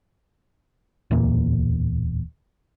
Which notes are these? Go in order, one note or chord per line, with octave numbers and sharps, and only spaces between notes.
D1 E2 A#2 A#3